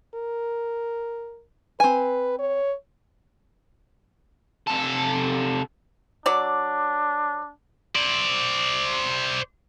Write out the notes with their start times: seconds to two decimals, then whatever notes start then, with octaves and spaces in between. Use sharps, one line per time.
0.14 A#4
1.80 C4 B4 G#5
2.39 C#5
4.68 C3 A4
6.26 F#3 D4 D5
7.95 C5 D5